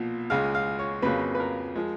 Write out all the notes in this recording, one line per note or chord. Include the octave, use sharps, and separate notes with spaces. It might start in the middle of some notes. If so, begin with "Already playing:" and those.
Already playing: B1 A#2 F3
C#2 C#3 G#3 F5
F5
C#5
F2 C#3 F#3 A#3 B4
B4
A#4
F3 G#3